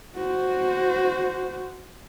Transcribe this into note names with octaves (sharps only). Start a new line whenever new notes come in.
F#4 C5